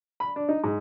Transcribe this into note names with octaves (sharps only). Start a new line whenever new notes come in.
B5
D4
D#4
G#2